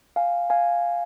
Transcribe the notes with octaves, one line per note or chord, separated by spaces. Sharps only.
F5 G#5
F5 G#5